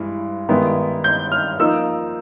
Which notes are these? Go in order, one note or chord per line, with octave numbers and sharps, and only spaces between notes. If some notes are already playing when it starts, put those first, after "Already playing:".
Already playing: G2 E3 G#3
G2 D#3 G#3 B3 E4
G6
F6
F3 A#3 D#4 E6